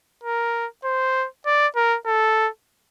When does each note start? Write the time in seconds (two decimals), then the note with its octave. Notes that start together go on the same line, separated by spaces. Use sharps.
0.24 A#4
0.85 C5
1.46 D5
1.76 A#4
2.06 A4